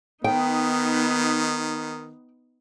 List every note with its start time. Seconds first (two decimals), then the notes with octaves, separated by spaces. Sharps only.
0.24 D#3 B3 D#4 G5